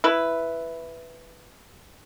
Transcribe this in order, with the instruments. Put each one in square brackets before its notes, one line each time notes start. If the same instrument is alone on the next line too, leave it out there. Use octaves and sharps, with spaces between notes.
[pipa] E4 B4